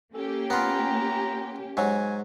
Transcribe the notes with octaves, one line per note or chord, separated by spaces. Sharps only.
A#3 C#4 G4 A4
B3 F4 A#5
G#2 F#3 G#5